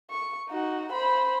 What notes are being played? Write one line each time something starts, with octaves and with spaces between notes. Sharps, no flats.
C#6
D#4 F#4
C5 B5